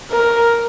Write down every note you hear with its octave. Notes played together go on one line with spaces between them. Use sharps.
A#4